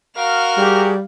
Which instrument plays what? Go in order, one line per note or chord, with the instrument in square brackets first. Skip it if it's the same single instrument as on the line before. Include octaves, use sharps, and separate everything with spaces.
[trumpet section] F#4 A#4 [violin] F5 F7
[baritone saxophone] G3 [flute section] G4 G#4